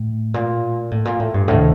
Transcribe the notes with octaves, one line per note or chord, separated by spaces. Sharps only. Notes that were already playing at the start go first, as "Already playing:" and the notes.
Already playing: A2
A#2
A2
A#2
A2
G2
D2 A2 C3 D#3